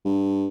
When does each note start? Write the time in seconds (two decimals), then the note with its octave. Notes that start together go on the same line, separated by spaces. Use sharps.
0.05 G2